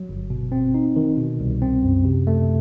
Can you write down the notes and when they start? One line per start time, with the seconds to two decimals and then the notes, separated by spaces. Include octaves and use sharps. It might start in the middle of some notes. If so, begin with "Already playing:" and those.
Already playing: F#3
0.09 G1
0.30 B2
0.52 C4
0.74 D#4
0.96 D#3
1.17 B2
1.40 C2
1.62 C4
1.82 F#2
2.05 C3
2.27 A3